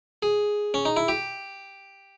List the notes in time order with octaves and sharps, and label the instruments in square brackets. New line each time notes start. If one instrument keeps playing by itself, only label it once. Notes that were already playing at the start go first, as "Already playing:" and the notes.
[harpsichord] G#4
C#4
D#4
E4
G4